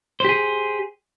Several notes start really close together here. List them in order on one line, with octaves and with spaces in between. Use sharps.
C5 G4 G#4